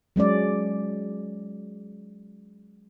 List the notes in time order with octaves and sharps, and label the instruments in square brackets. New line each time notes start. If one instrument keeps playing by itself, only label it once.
[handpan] F#3 G#3 C#4 D5